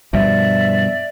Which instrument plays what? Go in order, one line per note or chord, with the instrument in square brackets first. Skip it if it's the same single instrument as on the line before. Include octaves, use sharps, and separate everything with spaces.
[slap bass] G2 B2 F3 [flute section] D5 E5